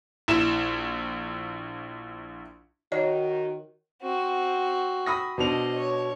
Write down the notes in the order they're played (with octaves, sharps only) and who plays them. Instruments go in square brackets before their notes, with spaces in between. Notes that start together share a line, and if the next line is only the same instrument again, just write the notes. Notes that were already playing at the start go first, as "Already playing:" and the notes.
[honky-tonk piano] A#1 E4 E7
[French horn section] D#3 F#4 [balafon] C#5 D#5
[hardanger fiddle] C4 F#4
[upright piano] B5 D#6 A#6
[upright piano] B2 D4 F7 [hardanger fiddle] C5 D#5
[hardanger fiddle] C#5